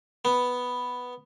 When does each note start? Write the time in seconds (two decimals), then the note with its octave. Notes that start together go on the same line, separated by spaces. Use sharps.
0.25 B3